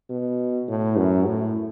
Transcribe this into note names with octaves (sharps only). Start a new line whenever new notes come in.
B2
A2
F#2
A2